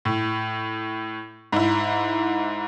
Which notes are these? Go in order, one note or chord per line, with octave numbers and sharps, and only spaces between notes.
A2
G#2 E4